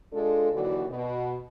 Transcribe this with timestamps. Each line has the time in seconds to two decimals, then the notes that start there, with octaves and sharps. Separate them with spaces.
0.13 G#3 D4 F4 A4
0.52 D#2 D3 E3 F#3 F#4 D5
0.88 B2